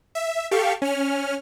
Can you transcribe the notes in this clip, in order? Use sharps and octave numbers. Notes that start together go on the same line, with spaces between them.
E5
G4 A4 F5 C#6
C#4 F6